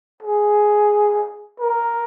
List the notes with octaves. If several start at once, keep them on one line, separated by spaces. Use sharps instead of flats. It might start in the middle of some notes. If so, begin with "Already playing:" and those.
G#4
A#4